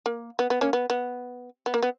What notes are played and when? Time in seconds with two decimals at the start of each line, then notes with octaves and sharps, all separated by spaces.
0.06 A#3
0.39 B3
0.50 B3
0.61 A#3 C#4
0.73 B3
0.90 B3
1.66 B3
1.74 A#3
1.83 B3